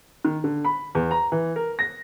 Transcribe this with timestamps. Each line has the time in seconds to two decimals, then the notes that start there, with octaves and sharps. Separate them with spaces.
0.25 D#3
0.44 D3
0.65 B5
0.95 E2
1.11 A#5
1.32 E3
1.56 A#4
1.79 A#6